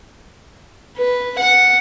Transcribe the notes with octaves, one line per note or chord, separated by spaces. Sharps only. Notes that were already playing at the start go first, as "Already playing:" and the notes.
B4
F#5